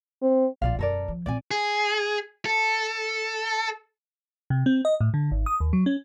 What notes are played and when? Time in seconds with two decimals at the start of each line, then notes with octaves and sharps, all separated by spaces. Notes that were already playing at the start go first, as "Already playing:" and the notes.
0.22 C4
0.62 A#1 F4 D5 F5
0.79 E1 F#2 A4 A#4 D5
1.08 F3
1.26 A#2 C4 D5 G#5
1.51 G#4
2.45 A4
4.50 C3
4.66 C4
4.85 D#5
5.01 A2
5.14 D3
5.31 G#1
5.46 D#6
5.60 D#2
5.73 F#3
5.86 C#4